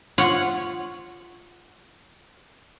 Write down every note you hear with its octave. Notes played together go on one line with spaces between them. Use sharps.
F4 C#5 F#5